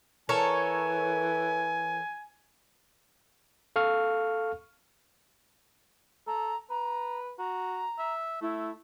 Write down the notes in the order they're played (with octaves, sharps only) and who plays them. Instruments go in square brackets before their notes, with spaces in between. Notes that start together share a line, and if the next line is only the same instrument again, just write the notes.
[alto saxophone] E3 [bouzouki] A4 A#4 C#5 [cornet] G#5
[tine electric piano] A4 F5 C#6 F6
[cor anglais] A4 [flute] A#5
[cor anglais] B4 [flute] A#5
[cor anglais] F#4 [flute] A#5
[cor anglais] E5
[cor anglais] A3 [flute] E4